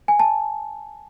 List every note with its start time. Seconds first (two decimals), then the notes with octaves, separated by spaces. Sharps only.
0.08 G#5
0.19 A5